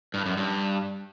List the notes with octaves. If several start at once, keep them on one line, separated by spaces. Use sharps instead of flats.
G2
F#2
G2